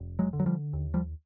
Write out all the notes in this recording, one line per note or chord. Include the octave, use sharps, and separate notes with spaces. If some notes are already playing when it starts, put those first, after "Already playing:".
Already playing: F1
F#3 G#3
D3
F#3
F3 G3
D#2
F3 G3